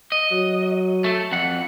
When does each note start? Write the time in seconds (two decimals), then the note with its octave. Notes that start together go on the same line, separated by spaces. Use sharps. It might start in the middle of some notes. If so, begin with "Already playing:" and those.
0.12 D#5
0.31 F#3
1.04 A3 A4
1.32 F2 F#5